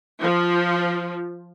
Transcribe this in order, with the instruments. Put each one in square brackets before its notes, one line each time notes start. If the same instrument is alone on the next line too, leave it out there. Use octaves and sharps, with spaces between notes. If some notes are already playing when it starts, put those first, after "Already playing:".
[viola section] F3